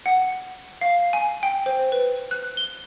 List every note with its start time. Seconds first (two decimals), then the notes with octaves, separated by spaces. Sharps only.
0.06 F#5
0.81 F5
1.13 G#5
1.43 G5
1.66 C5
1.92 B4
2.31 F#6
2.57 G7